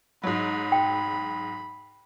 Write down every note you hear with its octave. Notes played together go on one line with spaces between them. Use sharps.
G#2 F#3 B5
G5